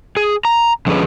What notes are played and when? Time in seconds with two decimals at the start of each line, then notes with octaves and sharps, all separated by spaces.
0.17 G#4
0.45 A#5
0.87 D3 F3 C#4 G#4 B4